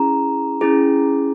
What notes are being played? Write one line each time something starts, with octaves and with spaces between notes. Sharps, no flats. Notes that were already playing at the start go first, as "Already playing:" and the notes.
Already playing: C#4 E4 G#4 A#5
C#4 E4 G#4